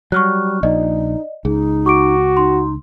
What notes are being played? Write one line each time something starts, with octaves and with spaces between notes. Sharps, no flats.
F#3 G3 C#6 F6 F#6
A#1 D#4 D5 D#5
C#2 D#4 G#4
F#4 C#6 D6 D7
D#4 C6